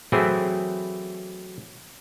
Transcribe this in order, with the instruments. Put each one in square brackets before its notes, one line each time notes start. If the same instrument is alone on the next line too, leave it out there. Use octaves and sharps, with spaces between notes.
[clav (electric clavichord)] E3 F#3 A3 C4 E4 G#4